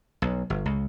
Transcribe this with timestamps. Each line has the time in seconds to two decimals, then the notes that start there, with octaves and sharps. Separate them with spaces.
0.22 B1
0.50 G1
0.66 C#2